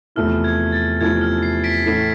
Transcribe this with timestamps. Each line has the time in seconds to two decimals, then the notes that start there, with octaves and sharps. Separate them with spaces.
0.16 E2 C3 F3 A3 E4 F6
0.44 G#6
0.72 A6
1.01 E2 C3 F3 A3 E4 G#6
1.21 F6
1.43 C7
1.64 B6 D7
1.84 A2 E3 A3 E4 C7
1.94 B6